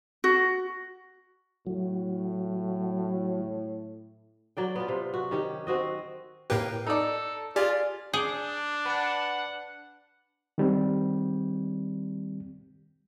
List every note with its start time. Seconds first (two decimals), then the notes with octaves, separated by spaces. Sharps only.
0.24 F#4
1.67 A2 F#3
4.57 F#3 D5 G5
4.76 B3 F4
4.88 C3
5.14 F#4
5.31 D#3 C#4 G4 C#5
5.67 C4 F#4 D#5
6.50 A2 A#3 G4 B4
6.87 D#4 A4 D5
7.56 F4 G4 G#4 D5
8.14 D4 G#4 D6 G6
8.86 B4 F#5 A5
10.58 D#3 G3 C4